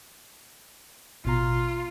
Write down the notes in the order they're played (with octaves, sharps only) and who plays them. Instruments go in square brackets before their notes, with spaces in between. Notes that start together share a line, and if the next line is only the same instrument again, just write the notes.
[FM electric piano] A1 B2 A#5 [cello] F4